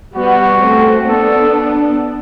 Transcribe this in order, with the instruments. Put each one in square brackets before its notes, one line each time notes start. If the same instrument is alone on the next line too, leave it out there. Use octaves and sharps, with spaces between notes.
[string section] G3 B3 [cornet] F#4
[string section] A3 C4
[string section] B3 D4 [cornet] A4